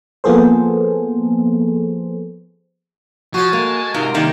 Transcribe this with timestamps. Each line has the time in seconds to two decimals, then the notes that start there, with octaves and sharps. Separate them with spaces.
0.24 F3 A#3 B3 G#4 A4 C5
3.34 F3 F#4 C#5 G#5 A5
3.53 G#3 A#3
3.94 G#2 C3 F4 A#4
4.14 C3 D#3 G3 A#3